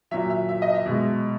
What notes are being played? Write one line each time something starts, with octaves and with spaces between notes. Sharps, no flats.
A#2 F#3 E5
E5
E5
D#5
E5
B2 G#3